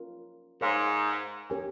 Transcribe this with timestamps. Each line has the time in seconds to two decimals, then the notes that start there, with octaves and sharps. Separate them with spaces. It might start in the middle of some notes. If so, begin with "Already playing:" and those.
Already playing: C#4 F4 A#4
0.61 G#2 A#4 C#5 F5 C6
1.50 C#4 G4 A#4 C#5 G#5